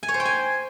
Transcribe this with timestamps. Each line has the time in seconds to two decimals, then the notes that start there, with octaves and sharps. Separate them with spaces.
0.03 G#5
0.08 C#5
0.14 C5
0.20 G5
0.25 G#5